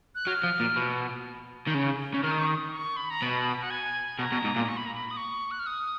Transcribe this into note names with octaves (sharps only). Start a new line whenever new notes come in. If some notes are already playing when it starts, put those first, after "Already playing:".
F#6
F#3 F6
F3
A#2
B2
D#3
C#3
C#3
D#3 F6
D#6
C#6
D#6
C#6
B5
A#5
B2 B5
F#5
G#5
B2 A#5
B2
G#2
A#2
C#6
B5
A#5
B5
D#6
C#6
F#6
F6
D#6